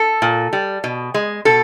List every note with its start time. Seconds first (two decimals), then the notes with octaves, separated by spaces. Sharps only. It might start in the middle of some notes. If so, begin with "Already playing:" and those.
Already playing: A4
0.22 A#2
0.53 G3
0.84 B2
1.14 G#3
1.45 B2 A4